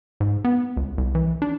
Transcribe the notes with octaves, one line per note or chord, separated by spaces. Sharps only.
G#2
B3
C#2
C2
E3
D4